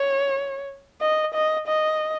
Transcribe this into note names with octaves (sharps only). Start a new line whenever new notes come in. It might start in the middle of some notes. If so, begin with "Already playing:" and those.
Already playing: C#5
D#5
D#5
D#5